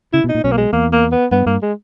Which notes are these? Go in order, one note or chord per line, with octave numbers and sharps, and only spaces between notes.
C#3 E4
B2
D#4
A#2
B1 B2 C#4
A#3
G#3
E2 A#3
A#3
B3
G2 B3
G2 A#3
G#3